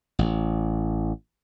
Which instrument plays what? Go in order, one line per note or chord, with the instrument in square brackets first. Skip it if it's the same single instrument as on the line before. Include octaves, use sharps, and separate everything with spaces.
[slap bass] A1